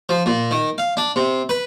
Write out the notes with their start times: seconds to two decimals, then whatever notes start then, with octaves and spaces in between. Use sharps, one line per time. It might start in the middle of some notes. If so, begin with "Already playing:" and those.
0.09 F3
0.26 A#2
0.51 D#3
0.78 F5
0.97 D4
1.16 C3
1.49 B4